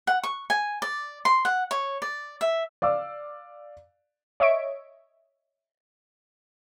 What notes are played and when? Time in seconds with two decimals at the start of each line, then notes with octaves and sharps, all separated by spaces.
0.07 F#5
0.23 C#6
0.50 G#5
0.82 D5
1.25 C6
1.45 F#5
1.71 C#5
2.02 D5
2.41 E5
2.82 D5 F5 D6 E6
4.40 C#5 D#5 E5 C#6 D7